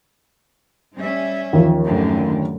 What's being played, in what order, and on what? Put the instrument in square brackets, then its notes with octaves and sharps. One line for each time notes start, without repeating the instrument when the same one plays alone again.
[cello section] G3 C#4 E5
[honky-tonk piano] D#2 F3
[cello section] F#2 A2 D3